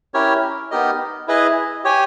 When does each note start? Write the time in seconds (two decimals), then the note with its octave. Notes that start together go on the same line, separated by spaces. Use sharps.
0.14 C#4 E4 G4 A#4 C#5
0.71 B3 D#4 G4 A#4 D#5
1.28 E4 G#4 B4 D#5
1.84 G4 C#5 G#5